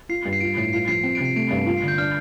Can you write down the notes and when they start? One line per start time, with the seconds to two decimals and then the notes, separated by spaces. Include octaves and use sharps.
0.09 F4 C7
0.25 G2
0.33 C7
0.41 F4 D7
0.57 A2 C7
0.73 F4 C7
0.88 F3 C7
1.03 C4
1.15 D7
1.20 C3 C7
1.36 A3 D7
1.51 G2
1.66 F4
1.77 C7
1.83 D3 G6
1.98 D4 F6